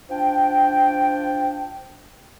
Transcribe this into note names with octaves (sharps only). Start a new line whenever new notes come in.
F3 D4 G5